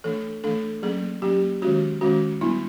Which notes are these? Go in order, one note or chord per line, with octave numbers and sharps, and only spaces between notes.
E3 A3 D4 A4
E3 A3 D4 A4
F#3 A#3 C#4 G#4
F#3 A#3 C#4 G4
D#3 G#3 C#4 F#4
D#3 G#3 C#4 F#4
G3 B3 D4 E4